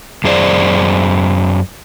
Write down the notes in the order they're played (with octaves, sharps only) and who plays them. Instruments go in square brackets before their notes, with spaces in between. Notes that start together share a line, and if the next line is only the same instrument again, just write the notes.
[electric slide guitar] F#2 G#4 C5 D5